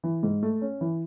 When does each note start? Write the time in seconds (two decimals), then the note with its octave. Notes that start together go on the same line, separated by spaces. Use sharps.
0.04 E3
0.23 G#2
0.43 A3
0.61 C#4
0.81 E3